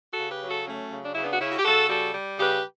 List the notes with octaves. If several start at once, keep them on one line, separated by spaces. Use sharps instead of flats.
F#4 A4
C#3
G4 B4
F#3
F#4 A4
F#3 A3 C#4
C#3
D4
C#3 E4
B3 D4
F#4
C#3 C#4 E4
F#4
G4
C#3 F#4 A4
G3 F#4 A4
G3
C#3 G4 B4